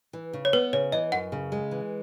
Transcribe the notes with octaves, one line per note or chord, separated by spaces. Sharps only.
E3
C#3
C#5
B3 B4
C#3 C#5
E3 D#5
F#2 F#5
C#3
G#3
E3